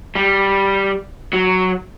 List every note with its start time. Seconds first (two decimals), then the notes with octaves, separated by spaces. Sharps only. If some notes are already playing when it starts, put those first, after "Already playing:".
0.15 G3
1.33 F#3